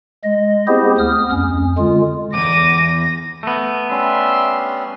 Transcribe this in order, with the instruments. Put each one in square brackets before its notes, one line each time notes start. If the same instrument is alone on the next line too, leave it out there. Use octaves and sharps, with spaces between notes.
[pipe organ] G#3 D#5
B3 C4 E4 G4 G#4 C5
D2 B3 D#6 F6
F2 C#4
D3 G#3 F4
[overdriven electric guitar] B1 E2 [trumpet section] D6 [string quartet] A#6 [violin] D#7
[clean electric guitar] A3 B3
[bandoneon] G3 C#4 [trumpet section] D4 E5 C6